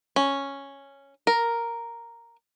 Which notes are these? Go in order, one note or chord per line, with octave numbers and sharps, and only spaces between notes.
C#4
A#4